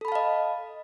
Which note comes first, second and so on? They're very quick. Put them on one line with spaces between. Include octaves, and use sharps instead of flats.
A4 B5 A5 F5 D#5